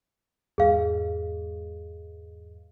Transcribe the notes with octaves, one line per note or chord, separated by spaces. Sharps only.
E2 G#2 G#4 F5